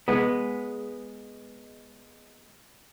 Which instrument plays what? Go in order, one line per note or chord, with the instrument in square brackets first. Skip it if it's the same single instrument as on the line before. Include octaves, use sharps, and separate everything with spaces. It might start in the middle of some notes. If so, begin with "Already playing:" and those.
[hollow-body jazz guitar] G#3 B3